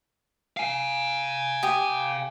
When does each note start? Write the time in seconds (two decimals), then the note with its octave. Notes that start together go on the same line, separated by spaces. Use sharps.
0.57 F5 G#5
1.63 G4 D#6